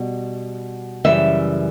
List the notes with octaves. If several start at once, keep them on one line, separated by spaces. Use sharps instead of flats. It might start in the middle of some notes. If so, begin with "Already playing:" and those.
Already playing: B2 G3
F#2 C#3 E3 G3 E5